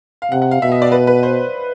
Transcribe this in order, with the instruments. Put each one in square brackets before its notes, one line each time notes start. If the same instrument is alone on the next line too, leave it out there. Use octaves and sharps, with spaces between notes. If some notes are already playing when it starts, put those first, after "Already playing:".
[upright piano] F5
[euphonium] C3 [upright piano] F#5
[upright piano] F#5
F5
[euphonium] B2 [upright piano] E5
[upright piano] D#5
D5
B4
B4
C5